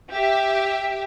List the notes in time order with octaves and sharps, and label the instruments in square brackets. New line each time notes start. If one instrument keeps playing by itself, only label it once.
[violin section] G4 E5